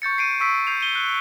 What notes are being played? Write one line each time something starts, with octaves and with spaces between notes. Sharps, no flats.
C#6 G6 A6 C#7
C7 D7 D#7
C#6 E6 B6 D7
G6 C7 F7
D#7 G7
F#6